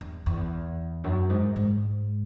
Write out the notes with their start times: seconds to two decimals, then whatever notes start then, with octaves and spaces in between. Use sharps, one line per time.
0.01 E2
0.26 E2
1.04 F#2
1.30 G#2
1.56 G#2